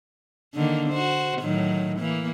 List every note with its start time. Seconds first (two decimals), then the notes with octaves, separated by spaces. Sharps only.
0.54 D3 D#3 A#3
0.90 F#4 C5
1.41 A2 D#3 F#3
1.99 E3 A#3